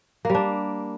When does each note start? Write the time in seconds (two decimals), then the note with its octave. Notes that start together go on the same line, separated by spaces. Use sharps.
0.25 A#3
0.30 G3
0.35 D4